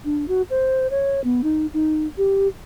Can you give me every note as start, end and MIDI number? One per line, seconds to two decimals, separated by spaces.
0.05 0.28 62
0.28 0.42 66
0.50 0.87 72
0.90 1.23 73
1.24 1.41 59
1.43 1.66 63
1.74 2.07 63
2.17 2.48 67